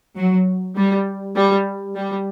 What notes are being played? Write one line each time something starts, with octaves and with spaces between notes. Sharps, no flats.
F#3
G3
G3
G3